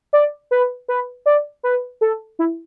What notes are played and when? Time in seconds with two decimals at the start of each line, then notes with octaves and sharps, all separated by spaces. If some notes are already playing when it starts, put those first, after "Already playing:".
0.13 D5
0.51 B4
0.88 B4
1.26 D5
1.63 B4
2.01 A4
2.39 E4